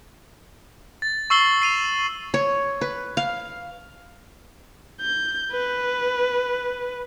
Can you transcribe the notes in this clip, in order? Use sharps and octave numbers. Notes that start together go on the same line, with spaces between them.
A6
C#6 E6 C7 F#7 G7
C7 D#7 F7
C#5
B4
F5
G6
B4